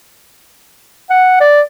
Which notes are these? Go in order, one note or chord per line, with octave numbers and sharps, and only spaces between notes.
F#5
D5